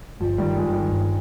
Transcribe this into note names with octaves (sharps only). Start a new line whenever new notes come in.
G1 F3
D#3 G3
G1
F3 G#3
G1
D#3 G3
G2